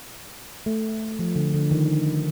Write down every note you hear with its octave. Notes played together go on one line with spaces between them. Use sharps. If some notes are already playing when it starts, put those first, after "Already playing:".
A3
F3
D3
D3
D#3